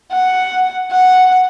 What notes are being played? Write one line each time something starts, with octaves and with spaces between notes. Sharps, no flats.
F#5
F#5